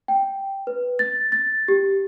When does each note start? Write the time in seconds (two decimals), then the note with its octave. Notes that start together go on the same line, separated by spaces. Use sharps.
0.08 G5
0.67 B4
0.99 A6
1.32 A6
1.68 G4